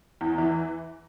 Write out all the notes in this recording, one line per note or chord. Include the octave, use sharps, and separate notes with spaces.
E2
E3